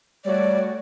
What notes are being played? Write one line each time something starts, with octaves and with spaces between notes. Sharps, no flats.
G3 A3 F#4 C#5 D5